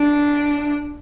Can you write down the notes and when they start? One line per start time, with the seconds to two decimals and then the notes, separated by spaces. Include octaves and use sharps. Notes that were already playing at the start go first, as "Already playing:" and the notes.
Already playing: D4